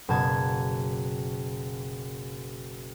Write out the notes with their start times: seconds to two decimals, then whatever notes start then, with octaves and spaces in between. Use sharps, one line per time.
0.08 F#1 B2 A5 G#6